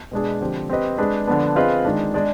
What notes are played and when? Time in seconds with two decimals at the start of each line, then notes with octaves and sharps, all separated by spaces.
0.12 B2 G#3 D4 G#4
0.41 D3 F3 C4 G4
0.70 C4 G4 B4 D#5
0.98 G#3 D4 G#4 B4
1.27 D3 F3 B3 D4
1.56 C4 F4 G#4 B4 D#5
1.85 D#3 G#3 D4
2.14 G#3 D4 G#4 D5